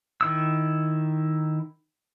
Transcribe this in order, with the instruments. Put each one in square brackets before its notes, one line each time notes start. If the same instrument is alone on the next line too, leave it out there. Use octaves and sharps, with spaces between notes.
[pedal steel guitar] D#3 E4 E6